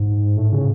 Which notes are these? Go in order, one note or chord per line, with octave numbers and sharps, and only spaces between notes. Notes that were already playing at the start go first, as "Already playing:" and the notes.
Already playing: G#2
A2
C#3